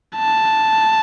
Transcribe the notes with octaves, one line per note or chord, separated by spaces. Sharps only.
A5